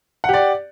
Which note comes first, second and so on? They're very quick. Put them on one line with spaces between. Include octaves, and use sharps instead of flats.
F#5 G4 D5